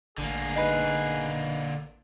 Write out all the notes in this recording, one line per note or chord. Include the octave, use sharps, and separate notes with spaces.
A1 D3 A#3 G#4
D#4 B4